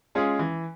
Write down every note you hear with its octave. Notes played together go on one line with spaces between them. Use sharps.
G#3 C#4 F4 G#4
E3